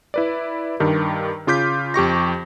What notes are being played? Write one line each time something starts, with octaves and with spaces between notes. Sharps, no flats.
E4 B4 D5
G2 D#3 G4
C#3 F4 D6 G6 B6
F2 G4 C#6 A#6